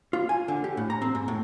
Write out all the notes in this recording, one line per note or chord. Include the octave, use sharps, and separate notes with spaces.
F4
G#5
D3
G4
A2
A#5
C4
G#2
A2